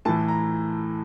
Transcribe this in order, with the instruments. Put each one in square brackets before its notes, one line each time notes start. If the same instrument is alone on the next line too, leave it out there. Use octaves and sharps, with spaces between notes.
[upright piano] A2 E3 A5
A#5